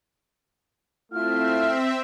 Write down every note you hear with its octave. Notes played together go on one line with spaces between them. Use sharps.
A3 C4 E4 F4 E5 F6